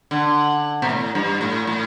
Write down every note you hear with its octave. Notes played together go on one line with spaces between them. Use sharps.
D3
B2
A2
G2
A2
A2